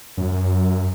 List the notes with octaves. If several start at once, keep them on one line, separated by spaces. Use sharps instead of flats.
F#2